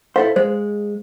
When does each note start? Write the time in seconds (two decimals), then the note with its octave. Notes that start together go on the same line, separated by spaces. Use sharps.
0.16 E4 A4 C5 F5
0.36 G#3 C5